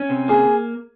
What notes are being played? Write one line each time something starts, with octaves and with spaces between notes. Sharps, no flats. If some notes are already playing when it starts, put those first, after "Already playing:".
Already playing: C#4
C3
A#3 G#4